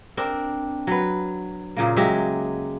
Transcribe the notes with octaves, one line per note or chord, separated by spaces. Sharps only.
C4 D4 A#4
F#3 B4
A#2 C#3 A#3
F#3 G#3 G4 E5